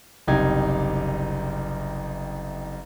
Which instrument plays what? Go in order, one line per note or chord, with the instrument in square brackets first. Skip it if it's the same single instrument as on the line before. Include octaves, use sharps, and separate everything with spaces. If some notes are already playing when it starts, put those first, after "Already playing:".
[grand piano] F#1 C2 D#4 G4 G#6